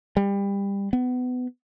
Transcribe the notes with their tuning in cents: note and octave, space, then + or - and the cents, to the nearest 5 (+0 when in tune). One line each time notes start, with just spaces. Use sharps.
G3 +25
B3 +25